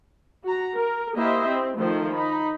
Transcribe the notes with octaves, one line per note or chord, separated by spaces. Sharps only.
F#4 A#5
A#4
A#3 E4 G4 C5 D#5 E5
C4
D#3 F3 A3 C5
D#4 B5